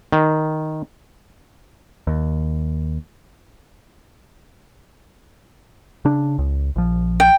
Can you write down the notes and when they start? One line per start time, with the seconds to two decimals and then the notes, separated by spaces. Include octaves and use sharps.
0.12 D#3
2.07 D#2
6.05 C#3 D4
6.38 C#2
6.76 A#1 F3
7.20 G5